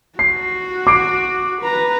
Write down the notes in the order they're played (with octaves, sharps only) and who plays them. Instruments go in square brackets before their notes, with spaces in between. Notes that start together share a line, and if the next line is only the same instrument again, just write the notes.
[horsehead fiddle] F#4 [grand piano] C7
[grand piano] D6 C7 D7
[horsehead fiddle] B4 A#5